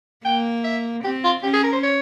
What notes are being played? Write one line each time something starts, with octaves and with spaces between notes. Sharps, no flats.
A#3 G5
E5
C4 G4
F4
C#4 G4
G#4
A#4
C5
C#5